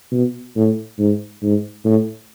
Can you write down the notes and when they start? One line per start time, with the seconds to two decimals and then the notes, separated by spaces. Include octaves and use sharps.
0.12 B2
0.56 A2
0.98 G#2
1.42 G#2
1.85 A2